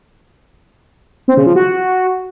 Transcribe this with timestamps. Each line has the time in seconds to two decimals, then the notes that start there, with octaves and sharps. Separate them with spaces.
1.28 C4
1.37 C#3
1.47 F3
1.56 F#4